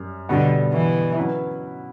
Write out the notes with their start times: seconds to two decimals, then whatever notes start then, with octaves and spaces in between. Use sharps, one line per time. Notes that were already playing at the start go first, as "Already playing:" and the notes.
Already playing: F#2 G3
0.29 B2 D3 G3 B3 F#4
0.73 E3
1.17 F#3 C#4 E4 B4